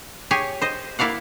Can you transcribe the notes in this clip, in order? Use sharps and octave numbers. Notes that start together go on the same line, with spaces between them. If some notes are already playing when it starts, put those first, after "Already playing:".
G4 G#4 C#5 G#5
C5 D#5
A#3 E4 D5 F5 F#5